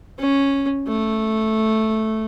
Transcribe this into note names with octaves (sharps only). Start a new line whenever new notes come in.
C#4
A3